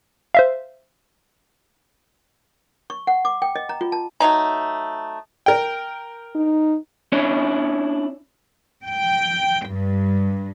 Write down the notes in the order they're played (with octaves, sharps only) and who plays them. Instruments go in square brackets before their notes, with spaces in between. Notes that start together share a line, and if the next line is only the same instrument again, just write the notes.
[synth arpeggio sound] C5 E5 F5
[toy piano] C#6
F#5
D6
G5
D#5
A#5
F4
A5
[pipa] F#3 A3 D#4 A#5
[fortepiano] A#4 G5
[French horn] D#4
[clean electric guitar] C#4 D4 E4 C#5 D5
[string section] G5
G2